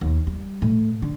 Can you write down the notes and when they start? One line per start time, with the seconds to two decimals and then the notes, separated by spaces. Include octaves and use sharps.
0.01 D#2
0.27 G3
0.62 A2
1.02 D3